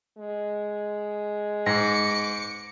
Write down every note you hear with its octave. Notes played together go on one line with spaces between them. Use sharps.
G#3
G#2 D6 A#6 C#7